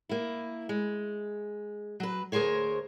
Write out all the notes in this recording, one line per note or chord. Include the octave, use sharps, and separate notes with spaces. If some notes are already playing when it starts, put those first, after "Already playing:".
A#3 E4
G#3
F#3 B4
D2 G#4 A#4 C5 C#5